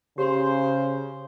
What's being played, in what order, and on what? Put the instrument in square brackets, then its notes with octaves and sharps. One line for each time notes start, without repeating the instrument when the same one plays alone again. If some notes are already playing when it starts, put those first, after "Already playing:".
[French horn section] C#3 [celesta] G4 C6 [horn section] C5